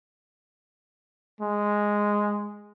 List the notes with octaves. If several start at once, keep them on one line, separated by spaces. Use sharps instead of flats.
G#3